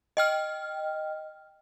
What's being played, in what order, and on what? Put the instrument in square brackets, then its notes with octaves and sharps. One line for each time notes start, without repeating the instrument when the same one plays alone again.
[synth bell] D#5 G5 F6